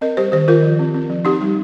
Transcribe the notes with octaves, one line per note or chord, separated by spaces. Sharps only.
C4 A#4 D#5
G3 G4 C5
D#3 G4 C5
D#3 F4 A#4
F3
C4
C4
F3
C4 D#4 G4
G3